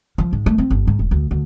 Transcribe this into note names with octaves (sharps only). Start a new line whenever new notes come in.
F3
G#2
A3
C4
G1
G#2
E1
D2
D2